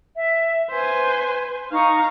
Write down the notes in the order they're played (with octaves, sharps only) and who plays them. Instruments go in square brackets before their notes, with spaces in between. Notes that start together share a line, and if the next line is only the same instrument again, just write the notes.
[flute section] E5
[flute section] B4 [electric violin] C5 G#5
[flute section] D#4 C#6 [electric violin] F5 A#5